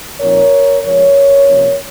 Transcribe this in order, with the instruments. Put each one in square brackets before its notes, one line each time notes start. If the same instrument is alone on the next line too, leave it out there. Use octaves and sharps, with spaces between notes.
[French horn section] A#2 F3 C4 D#4 A#4 C#5
C#3 F3 G#3 A#4 C#5
C3 F3 A#3 C#4